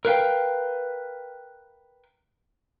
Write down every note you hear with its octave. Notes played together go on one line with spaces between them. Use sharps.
A#4 B4 F5 G5